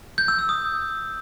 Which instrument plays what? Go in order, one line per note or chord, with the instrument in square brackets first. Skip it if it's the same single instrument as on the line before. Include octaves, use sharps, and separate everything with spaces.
[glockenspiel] G6
E6
E6
D#6